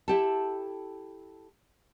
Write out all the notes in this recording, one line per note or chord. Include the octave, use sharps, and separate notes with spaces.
E4 G4 A4